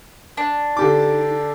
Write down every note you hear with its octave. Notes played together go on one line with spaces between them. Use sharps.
D4
D3 D#4 G4 D6